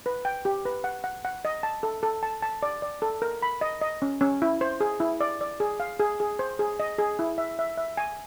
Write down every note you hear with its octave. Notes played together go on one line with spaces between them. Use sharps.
B4
G5
G4
B4
F#5
F#5
F#5
D#5
A5
A4
A4
A5
A5
D5
D5
A4
A#4
B5
D#5
D#5
C#4
C#4
E4
C5
G#4
E4
D5
D5
G#4
F5
G#4
G#4
C5
G#4
D#5
G#4
E4
E5
E5
E5
G#5